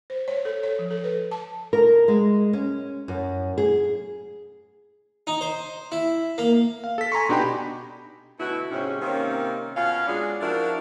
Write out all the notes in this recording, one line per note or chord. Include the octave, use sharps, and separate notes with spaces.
C5
C#5
A4
C#5
F3
A4
B4
A5
A#4
G#3
C#4
F#2
G#4
D#4
C5
E4
A#3
F5
A4 B6
G#5 A#5 C6 C#6
B2 D4 D#4 G4 G5 B5
D2 B2 B3 E4 F#4
G#2 C3 C#4
C3 D#3 A#3 C4 C#4
B2 C#4 F4 F5
F#3 G#3 C#4 D4 F4 G#4
F3 D4 E4 F#4 A#4